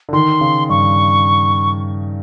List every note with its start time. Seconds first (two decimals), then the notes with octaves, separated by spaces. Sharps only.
0.09 D3
0.13 D#3 C6
0.41 C#3
0.69 G2 C#6